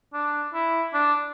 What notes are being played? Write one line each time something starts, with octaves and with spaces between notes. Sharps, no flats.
D4
E4
D4